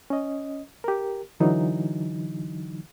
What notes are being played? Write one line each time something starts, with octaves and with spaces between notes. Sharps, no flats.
C#4 D#5
G4 A#4
D3 E3 F#3 D#4